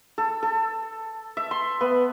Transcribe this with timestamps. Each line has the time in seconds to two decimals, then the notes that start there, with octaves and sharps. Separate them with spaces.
0.18 A4
0.43 A4
1.37 E5
1.51 C6
1.81 B3